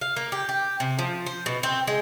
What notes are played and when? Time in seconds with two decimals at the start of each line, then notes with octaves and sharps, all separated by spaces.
0.01 F5
0.16 A#3
0.32 G4
0.49 G4
0.80 C3
0.99 F3
1.26 C5
1.46 B2
1.63 C4
1.87 G#3